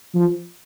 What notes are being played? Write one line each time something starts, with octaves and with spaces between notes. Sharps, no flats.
F3